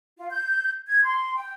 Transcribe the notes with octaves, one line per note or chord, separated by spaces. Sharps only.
F4
G6
G#6
C6
G5